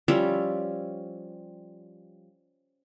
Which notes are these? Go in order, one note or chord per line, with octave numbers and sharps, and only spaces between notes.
F3 G3 C#4 E5